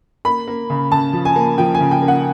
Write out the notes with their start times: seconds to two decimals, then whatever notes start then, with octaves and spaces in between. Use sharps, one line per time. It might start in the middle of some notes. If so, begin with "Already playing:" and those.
0.25 A#3 B5
0.48 A#3
0.70 C#3
0.92 C#3 A5
1.13 F3
1.25 G#5
1.36 A#3
1.58 F3 G5
1.75 G#5
1.80 C#3
1.91 G5
2.02 A#3
2.08 F#5